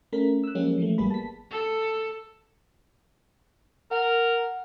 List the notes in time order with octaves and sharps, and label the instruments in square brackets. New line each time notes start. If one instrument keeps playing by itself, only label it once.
[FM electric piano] A3 C#4 A#4 B6
E6 F#6
F3 F#3 G#3 A#3 C#4 G4
E3 F3 A3
G#1 G3 A#3 B3 G#4 B5
A5 B6
[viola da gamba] A4
[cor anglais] A#4 [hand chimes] F#5